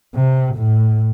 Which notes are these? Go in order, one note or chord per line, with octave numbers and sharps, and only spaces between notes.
C3
A2